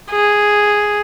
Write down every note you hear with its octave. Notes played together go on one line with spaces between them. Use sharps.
G#4